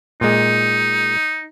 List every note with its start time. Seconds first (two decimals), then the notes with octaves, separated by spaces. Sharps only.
0.21 A#2 G#3 D#4